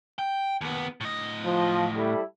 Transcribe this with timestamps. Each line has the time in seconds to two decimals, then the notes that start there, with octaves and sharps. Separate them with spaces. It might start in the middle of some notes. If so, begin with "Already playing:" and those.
0.19 G5
0.61 D#2 B3
1.01 A2 D#5
1.44 F3
1.94 G3 E4 A4